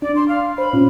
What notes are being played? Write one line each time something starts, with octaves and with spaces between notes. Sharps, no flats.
D4 D5
C6
F5
C5 B5
A#2 C#4 F4